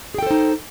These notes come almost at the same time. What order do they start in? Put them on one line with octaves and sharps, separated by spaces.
G#4 G5 A4 C5 D#4